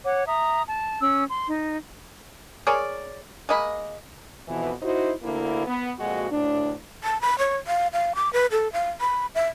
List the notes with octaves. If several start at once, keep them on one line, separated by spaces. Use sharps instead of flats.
C#5 F#5 D6
E5 A#5 D#6
A5
C#4 E6
C6
D#4
G#4 A#4 C#5 D5
G#3 A#3 D#5 B5
F2 B2 E3
D#4 E4 F#4 C5
D2 D3 A#3 E4
B3
F2 A#2 G#3 F#4
D2 A2 D4
A5
B5
C#5
F5
F5
D6
B4
A4
F5
B5
E5